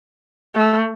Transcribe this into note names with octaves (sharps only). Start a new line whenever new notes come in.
A3